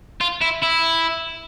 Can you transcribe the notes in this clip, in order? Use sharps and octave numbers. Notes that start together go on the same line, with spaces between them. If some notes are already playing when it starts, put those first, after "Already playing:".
F4
E4
E4